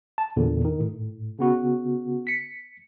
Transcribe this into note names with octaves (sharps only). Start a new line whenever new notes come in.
A5
E2 A#2 D3
D#3
A2
C#3 B3 F#4
B6 C#7